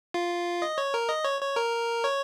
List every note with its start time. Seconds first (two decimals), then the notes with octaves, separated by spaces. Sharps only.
0.14 F4
0.62 D#5
0.78 C#5
0.94 A#4
1.09 D#5
1.24 C#5
1.41 C#5
1.56 A#4
2.04 C#5